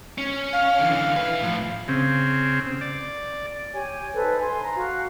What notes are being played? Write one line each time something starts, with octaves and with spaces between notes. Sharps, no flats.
C#4
F5
D3 E3
E4 B4
A2 F3
C#3 C4
D5
G4 C#5 G#5
D#4 A4 B4 C5
G#5 C6
A#5
F#4 F5